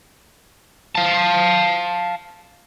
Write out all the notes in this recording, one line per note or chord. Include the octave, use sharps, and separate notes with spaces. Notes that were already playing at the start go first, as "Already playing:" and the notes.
F5 A5